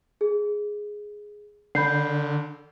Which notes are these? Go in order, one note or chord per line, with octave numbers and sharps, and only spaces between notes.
G#4
D3 B5 G6 C7